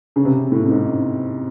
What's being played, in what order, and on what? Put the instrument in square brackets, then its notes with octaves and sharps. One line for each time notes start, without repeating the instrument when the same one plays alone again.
[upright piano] C#3
C3
A2
A2
G#2